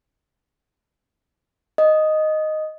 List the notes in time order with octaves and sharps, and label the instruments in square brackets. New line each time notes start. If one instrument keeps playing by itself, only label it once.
[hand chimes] D#5